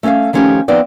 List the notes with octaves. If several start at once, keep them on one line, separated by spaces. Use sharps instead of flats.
A3 C#4 A4 E5 F5
D#3 F3 A3 C#4 D#4 G4
F3 B3 C4 D#4 D5